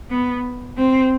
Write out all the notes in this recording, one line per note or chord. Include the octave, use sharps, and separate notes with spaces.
B3
C4